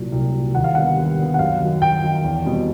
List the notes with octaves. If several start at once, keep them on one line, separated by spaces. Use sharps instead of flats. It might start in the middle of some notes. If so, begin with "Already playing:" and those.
Already playing: C2 A#2 F#3
C2
F#3
A#2
D#2 F#5
F5
D3 G3 B3 F#5
D#2
D3 G3 B3
F#5
F#2 F5
D#3 F#3
F#2 G5
D#3 F#3
E2
B2 G3 C4